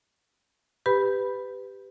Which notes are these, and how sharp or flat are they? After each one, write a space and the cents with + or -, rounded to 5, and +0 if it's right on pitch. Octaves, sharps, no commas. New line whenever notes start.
G4 +5 B4 +20 B5 +0